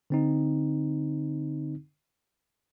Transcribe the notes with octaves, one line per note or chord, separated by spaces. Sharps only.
D3 C4 D#4